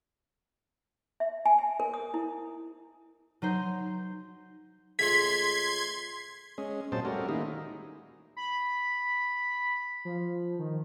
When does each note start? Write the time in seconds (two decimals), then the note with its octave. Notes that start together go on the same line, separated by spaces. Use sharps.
1.20 E5
1.46 G#5
1.59 G#5
1.80 A#4
1.94 D#6
2.14 E4
3.42 F#3 D#4 C5
4.99 C#2 C#3 A3 C6 G#6 B6
6.58 G#3 C#4
6.92 A#2 F#3 G#3 C4 C5 A5
7.05 G3 A3 C#4 F#4 A#4
7.29 D#3 G#3 A#3 D#4 E4
8.37 B5
10.05 F3
10.59 D#3